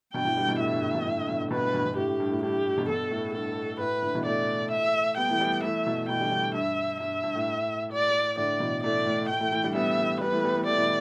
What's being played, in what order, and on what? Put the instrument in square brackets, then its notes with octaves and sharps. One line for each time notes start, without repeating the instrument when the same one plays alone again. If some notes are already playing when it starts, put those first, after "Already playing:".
[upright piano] G2 B2 [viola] G5
[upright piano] B2 E3
D3 G3
B2 E3
[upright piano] A2 D3 [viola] E5
[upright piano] G2
A2
G2 B2
A2 D3
A2 D3
G2 B2
A2
[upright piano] G2 B2 [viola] B4
[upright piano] A2
G2 B2
G2 B2
[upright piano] A2 D3 [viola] G4
[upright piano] A2
G2
A2
[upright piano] G2 [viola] G4
[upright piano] A2
A2
G2 B2
[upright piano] G2 B2 [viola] A4
[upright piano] A2
[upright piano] G2 [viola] A4
[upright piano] A2 [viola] B4
[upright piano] A2 D3
B2 E3
[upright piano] E3 A3 [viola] D5
[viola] E5
[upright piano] G3 B3 [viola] G5
[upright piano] E3 A3
G3 B3
[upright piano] E3 A3 [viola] E5
[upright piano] B2 E3
[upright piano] B2 E3 [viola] G5
[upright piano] D3 G3
D3 G3
[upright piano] G2 [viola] E5
[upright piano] G2 [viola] E5
[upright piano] G2
A2
[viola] D5
[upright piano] A2 D3 [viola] D5
[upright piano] B2 E3
[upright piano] E3 A3 [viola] D5
[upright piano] A2
[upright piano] A2 [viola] G5
[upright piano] E3 A3
E3 A3
D3 G3
[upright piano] G3 B3 [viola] E5
[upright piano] E3 A3
[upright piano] G3 B3 [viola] B4
[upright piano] E3 A3
G3 B3
E3 A3
[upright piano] E3 A3 [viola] D5
[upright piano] B2 E3